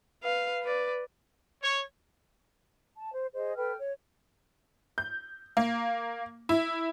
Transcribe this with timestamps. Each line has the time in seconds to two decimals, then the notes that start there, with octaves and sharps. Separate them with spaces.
0.23 B4 F5
0.63 B4 D5
1.62 C#5
2.97 A5
3.14 C5
3.34 G#4 C5 D#5
3.56 A4 B4 G5 F6
3.80 C#5
4.98 G6
5.57 A#3
6.49 E4